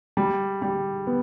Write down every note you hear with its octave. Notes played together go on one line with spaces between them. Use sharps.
G3
G3
B3